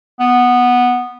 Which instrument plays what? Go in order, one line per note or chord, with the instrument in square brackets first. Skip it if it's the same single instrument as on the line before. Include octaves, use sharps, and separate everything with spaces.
[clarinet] B3